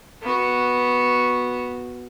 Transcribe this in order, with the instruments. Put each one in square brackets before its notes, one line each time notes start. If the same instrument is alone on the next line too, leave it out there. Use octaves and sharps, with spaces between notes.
[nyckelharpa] B3 F#4